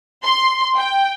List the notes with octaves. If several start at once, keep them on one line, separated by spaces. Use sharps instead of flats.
C6
G5